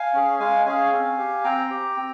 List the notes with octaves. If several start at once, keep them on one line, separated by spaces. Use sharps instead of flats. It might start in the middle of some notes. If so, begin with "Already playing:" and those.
Already playing: F5 G#5
C#4 G#4
G#3 F5 G#5
C#4 G#4 F5 G#5
C4
G4
C4 G5 A#5
G4
C4